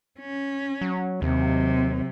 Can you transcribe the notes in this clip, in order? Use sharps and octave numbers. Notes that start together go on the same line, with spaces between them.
C#4
F#3
D#2 C3 F#3